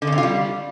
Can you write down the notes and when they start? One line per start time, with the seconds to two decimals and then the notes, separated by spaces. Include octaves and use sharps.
0.02 D3
0.07 C#3
0.12 C3
0.18 F4
0.23 G3